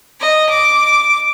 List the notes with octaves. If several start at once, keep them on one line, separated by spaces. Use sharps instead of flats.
D#5
D6